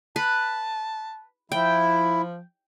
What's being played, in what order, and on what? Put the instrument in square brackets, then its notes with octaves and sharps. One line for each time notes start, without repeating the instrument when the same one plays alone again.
[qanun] B4 [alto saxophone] A5
[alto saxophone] F3 [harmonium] E4 [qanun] G5